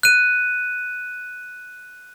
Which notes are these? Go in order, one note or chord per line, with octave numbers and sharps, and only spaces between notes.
F#6 D#7